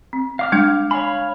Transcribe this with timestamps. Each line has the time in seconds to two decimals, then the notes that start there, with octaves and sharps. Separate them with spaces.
0.13 C4
0.39 F5 D6 F6
0.52 G3 G#3 D4
0.91 C#5 F5 G#5 B5